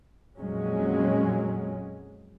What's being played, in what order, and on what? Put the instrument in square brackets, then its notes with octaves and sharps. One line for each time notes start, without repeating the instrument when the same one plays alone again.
[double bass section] F2 A#2 F#3 G#3 C#4